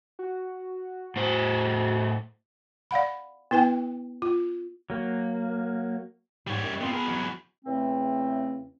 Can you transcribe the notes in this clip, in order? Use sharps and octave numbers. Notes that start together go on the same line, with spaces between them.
F#4
A2 C5
D5 F5 F#5 B5
B3 E4 B4 G5 G#5
F4
F#3 A#3
G#2 G3 C#5
F#2
B3 C4 F4
B3 G#4 A#4
E2 F#3
E2 C#3 E3 A3 C4